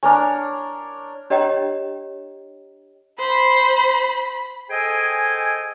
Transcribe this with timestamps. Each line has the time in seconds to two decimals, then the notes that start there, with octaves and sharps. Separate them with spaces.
0.03 D4 A#4 C#5 G#5
1.30 D4 G4 C#5 D#5 G5 A#5
3.19 C5 B5
4.70 G#4 A4 C5 D#5 G5 G#5